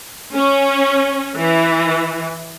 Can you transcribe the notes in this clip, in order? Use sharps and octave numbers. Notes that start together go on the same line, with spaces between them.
C#4
E3